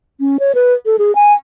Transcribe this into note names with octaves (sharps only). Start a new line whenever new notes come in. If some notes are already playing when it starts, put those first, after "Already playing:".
C#4
C#5
B4
A4
G#4
G#5